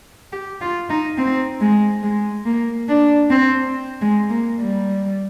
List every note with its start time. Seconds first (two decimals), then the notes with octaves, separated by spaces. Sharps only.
0.32 G4
0.61 F4
0.89 D#4
1.18 C4
1.61 G#3
2.03 G#3
2.45 A#3
2.89 D4
3.30 C4
4.01 G#3
4.30 A#3
4.59 G3